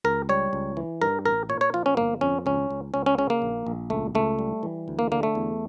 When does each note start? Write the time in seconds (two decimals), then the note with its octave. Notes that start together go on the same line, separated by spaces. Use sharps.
0.04 C#2 A#4
0.29 G3 C#5
0.53 C#2
0.77 E3
1.02 G2 A#4
1.25 A1 A#4
1.49 A#2 C#5
1.61 C#5
1.74 F3 F4
1.86 C#4
1.97 G1 A#3
2.21 F2 C#4
2.46 C#2 C#4
2.71 C#2
2.94 C#2 C#4
3.06 C#4
3.18 C#3 C#4
3.30 A#3
3.42 A#1
3.67 A#1
3.90 C#2 A3
4.15 C#2 A3
4.39 G3
4.63 E3
4.88 D2
4.99 A#3
5.12 D3 A#3
5.23 A3
5.35 E2